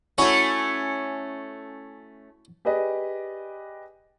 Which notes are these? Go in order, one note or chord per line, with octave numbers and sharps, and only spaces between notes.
A3 C#4 E4 F#4 C#5
G4 G#4 B4 D5 D#5